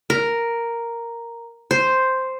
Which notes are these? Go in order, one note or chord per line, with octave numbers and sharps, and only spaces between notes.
A#4
C5